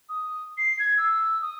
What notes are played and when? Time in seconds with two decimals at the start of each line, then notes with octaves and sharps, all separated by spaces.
0.09 D#6
0.58 C7
0.79 G#6
0.98 E6
1.42 D#6